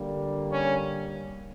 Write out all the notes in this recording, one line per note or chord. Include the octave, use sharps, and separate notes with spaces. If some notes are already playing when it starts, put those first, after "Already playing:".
Already playing: D3 G3 A#3
C#4 C#5